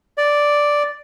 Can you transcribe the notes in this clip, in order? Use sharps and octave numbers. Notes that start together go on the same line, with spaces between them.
D5